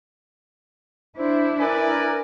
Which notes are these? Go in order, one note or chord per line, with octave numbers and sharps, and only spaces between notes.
D4 E4 C5
A#4 B4 D5 G#5